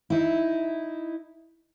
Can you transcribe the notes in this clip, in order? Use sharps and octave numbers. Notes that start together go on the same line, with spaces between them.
D#4 E4